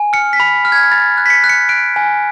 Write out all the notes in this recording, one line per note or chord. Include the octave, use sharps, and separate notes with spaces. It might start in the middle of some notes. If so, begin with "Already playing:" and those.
Already playing: G#5
F6 C#7
B6
B5
F6
G#6
B5 A6
F#6
B6
C#7
F#6
C#7
F#6 D7
G#5